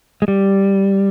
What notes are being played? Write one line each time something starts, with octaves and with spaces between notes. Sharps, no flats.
G#3
G3